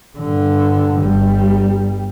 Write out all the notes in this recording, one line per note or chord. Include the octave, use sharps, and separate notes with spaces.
G2 D3
G1 G3